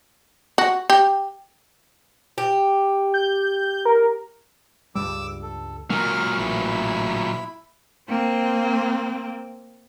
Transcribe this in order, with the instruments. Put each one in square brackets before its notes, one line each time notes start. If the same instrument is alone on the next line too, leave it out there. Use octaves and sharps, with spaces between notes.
[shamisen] F#4
G4
[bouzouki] G4
[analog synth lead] G6
A#4
[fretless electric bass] C#2 G2 G3 [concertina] D6 E6
[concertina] A4
[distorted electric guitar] A#2 F#3 [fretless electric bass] G#3 A#3 [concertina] F6
[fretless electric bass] A1 [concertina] E4 B5
[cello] A#3 C4